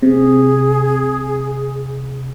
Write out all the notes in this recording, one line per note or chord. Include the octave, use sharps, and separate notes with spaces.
C3 G#4